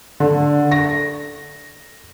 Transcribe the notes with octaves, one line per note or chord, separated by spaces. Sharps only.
D3
A#6